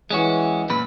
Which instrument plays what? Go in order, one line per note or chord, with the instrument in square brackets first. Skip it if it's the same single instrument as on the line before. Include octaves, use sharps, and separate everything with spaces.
[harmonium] E3 [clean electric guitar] G#3 C#4 F#4
[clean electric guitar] F#2 A#2 B4